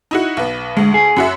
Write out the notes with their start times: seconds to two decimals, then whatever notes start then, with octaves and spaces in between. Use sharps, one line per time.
0.11 D#4 E4 F#4
0.37 B1 B3
0.77 D2 G#3
0.94 G#4
1.16 F#2 F#4 E5